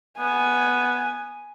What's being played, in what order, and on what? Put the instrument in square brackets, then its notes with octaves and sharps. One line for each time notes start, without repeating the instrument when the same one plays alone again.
[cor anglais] B3 [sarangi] G#5